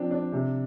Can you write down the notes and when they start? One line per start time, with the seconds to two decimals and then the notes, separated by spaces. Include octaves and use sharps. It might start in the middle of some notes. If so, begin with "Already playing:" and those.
Already playing: F3 C4 D4
0.11 D4
0.32 C3